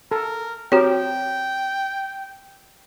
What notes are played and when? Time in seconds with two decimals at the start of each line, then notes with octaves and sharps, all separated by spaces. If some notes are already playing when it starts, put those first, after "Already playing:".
0.11 A4 A#4
0.72 C4 F#4 G4 A#4 C#5 G5